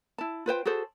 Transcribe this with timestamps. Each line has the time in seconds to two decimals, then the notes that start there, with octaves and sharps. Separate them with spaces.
0.18 E4 A5
0.46 F4 B4 C5 G5
0.65 F#4 G#4 A4 C5